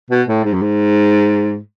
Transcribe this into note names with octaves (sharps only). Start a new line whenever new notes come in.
B2
A2
G#2
F#2
G#2